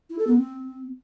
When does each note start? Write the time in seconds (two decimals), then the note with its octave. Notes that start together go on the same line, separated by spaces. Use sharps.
0.10 E4
0.18 A4
0.27 B3
0.36 C4